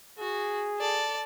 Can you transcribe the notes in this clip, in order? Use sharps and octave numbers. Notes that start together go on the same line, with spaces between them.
F#4 G#4
A4 D5